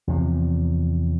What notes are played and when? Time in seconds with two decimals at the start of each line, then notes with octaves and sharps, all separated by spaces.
0.08 E2 C3 F3